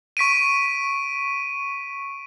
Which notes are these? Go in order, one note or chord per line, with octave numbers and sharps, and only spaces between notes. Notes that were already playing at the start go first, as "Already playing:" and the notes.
C#6 B6 D7 D#7